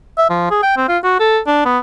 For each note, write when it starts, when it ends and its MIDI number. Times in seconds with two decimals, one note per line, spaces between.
0.18 0.29 76
0.30 0.47 53
0.51 0.59 68
0.63 0.76 79
0.77 0.86 60
0.89 0.98 65
1.04 1.16 66
1.20 1.39 69
1.47 1.63 62
1.65 1.79 59